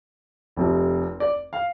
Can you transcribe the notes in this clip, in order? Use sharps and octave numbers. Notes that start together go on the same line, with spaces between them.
F1 F2 C3 F3
D5
F5